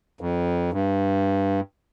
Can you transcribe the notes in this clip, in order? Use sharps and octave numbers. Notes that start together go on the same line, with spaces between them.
F2
G2